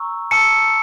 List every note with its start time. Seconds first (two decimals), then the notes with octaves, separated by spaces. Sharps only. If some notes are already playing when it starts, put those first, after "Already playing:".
Already playing: A#5 C#6 E6
0.31 A5 E6 C#7